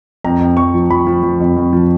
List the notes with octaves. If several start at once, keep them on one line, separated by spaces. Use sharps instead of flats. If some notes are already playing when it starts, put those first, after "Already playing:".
F2 A#5
F2
F2 C#6
F3
F3 B5
F3
F3
F2
F2
F3